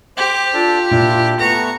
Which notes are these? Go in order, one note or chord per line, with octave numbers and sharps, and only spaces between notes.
G4 C5 D6
D4 F4 A4
A#2 D4 E4
A3 B3 A#5 C#6 A#6